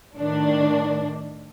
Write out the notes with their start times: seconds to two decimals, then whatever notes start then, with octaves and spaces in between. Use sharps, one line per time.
0.16 A2 D#3 D4